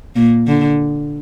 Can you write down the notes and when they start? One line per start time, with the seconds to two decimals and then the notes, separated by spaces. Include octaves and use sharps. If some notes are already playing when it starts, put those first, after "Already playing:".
0.16 A#2 A#3
0.47 D3